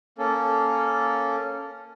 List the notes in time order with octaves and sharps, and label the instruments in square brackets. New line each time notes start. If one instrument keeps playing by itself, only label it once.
[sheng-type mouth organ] A#3 C#4 A4